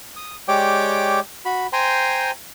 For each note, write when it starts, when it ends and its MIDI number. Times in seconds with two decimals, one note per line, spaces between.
0.16 0.36 87
0.48 1.20 56
0.48 1.20 67
0.48 1.20 73
0.48 1.20 74
0.48 1.20 79
0.48 1.20 86
1.45 1.67 66
1.45 1.67 83
1.73 2.31 72
1.73 2.31 79
1.73 2.31 80
1.73 2.31 82
1.73 2.31 84